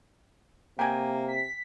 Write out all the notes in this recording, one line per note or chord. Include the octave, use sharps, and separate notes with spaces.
C3 A#3 G5 G#5
B6